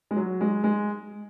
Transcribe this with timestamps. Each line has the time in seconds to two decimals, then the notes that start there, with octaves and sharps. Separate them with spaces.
0.11 G#3
0.16 F#3
0.41 G#3
0.64 G#3